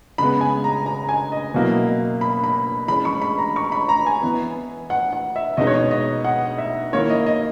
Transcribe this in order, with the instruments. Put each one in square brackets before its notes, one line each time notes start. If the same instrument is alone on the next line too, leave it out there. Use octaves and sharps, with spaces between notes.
[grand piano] C#3 G#3 B3 [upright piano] B5
[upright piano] G#5
A#5
A#5
G#5
D#5
[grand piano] B2 F#3 A#3 E4
[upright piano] B5
B5
[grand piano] E3 G#3 C#4 [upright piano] B5
[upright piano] C#6
B5
A#5
C#6
B5
A#5
G#5
[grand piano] E3 B3 E4
[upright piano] F#5
F#5
E5
[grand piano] B2 G#3 B3 D#4 [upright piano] D#5
[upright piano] C#5
D#5
D#5
F#5
E5
[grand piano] D#3 A#3 E4 [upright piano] C#5
[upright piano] D#5
D#5